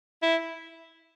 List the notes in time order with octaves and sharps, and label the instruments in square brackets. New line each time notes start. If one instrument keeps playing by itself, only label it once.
[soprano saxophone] E4